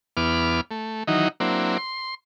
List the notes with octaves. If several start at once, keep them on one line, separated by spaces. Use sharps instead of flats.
E2 B3 D6 F6
A3
D#3 E3 F#3 D#4
F#3 A#3 C4 D4 E4
C6